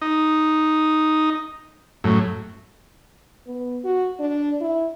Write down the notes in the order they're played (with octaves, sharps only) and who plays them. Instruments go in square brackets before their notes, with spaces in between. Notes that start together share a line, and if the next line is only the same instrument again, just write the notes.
[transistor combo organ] D#4
F#2 A2
[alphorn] B3
F#4
D4
E4